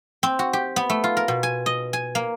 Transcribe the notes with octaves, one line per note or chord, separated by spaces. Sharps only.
C4
F#4
G4
B3
A3
F4
A#4
B2
G#5
D#5
G#5
A#3